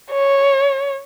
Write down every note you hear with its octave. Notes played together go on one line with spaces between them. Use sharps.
C#5